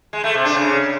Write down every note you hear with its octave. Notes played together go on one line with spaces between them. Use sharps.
G#3
A3
C3
D4
C#3